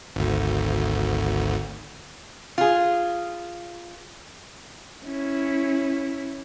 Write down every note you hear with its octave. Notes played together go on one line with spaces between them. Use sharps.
G#1 D2
F4 G#4
C#4 E4